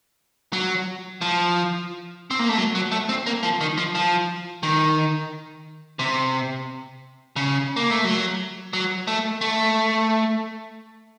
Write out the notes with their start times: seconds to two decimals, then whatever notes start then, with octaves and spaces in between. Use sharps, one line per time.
0.53 F#3
1.21 F3
2.31 C4
2.39 A#3
2.49 A3
2.58 F#3
2.75 F#3
2.92 A3
3.09 C4
3.26 A#3
3.43 F3
3.61 D#3
3.77 F3
3.95 F3
4.63 D#3
5.99 C3
7.36 C#3
7.76 A#3
7.91 A3
8.05 F#3
8.73 F#3
9.07 A3
9.41 A3